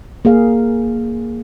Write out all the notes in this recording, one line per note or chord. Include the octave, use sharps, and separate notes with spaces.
A#3 G#4 F5